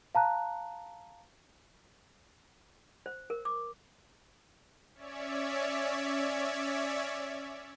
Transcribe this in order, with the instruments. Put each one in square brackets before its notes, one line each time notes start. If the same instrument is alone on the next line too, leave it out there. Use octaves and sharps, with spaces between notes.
[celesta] F5 A5 A#5 F#6
[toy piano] C5
A#4
D6
[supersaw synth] C#4 C#5 D5 E5